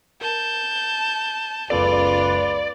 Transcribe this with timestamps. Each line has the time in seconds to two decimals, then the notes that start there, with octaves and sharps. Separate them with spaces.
0.21 A#4 A5 G6
1.70 F#1 C#2 B3 F4 A4 B4 D5